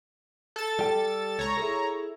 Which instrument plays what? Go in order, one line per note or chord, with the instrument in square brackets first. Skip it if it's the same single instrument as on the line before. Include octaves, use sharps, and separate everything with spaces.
[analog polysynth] A4 A6
[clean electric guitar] G3 G4 G5
[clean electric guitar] C#2 [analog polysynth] C#5 A#5
[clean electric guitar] E4 G#4 A4